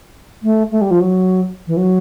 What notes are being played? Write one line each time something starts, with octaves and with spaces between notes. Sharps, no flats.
A3
A3
G3
F3
F#3
E3
F#3